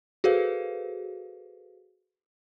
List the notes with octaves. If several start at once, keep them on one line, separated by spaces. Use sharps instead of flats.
F#4 G#4 A4 B4 C5 F5